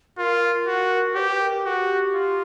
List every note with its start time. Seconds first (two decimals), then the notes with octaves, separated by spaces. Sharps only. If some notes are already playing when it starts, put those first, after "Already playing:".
0.18 F4 A#4
0.67 F#4
1.15 G4 C#5
1.19 B4
1.40 A#4
1.64 F#4 G4 A#4
2.14 F4